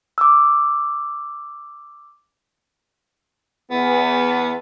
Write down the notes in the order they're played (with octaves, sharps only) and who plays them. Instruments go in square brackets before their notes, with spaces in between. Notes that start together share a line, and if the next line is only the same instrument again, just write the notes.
[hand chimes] D6 E6
[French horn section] E2 [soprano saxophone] B3